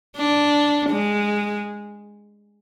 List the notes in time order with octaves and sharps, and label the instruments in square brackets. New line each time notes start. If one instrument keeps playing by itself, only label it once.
[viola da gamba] D4
G#3